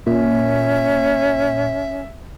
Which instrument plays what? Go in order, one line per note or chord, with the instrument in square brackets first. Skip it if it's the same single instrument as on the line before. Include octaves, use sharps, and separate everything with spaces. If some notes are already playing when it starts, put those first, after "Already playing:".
[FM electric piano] A#2 [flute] C#4 [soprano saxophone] E5